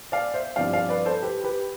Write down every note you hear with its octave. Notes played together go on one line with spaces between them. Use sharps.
D5 F5
C5 E5
G2 F3 C4 E4 D5 F5
D5 F5
B4 D5
A4 C5
G4 B4
G4 B4